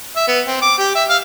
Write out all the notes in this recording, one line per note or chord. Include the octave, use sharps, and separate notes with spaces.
E5
B3
C4
D6
G4
E5
F5